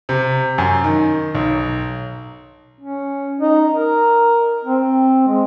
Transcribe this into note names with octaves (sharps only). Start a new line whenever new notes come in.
C3
F#2
D#3
B1
C#4
D#4
A#4
C4
G#3